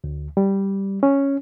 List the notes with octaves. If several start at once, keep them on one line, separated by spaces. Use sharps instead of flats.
D2
G3
C#4